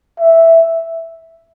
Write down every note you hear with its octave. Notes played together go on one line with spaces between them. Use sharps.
E5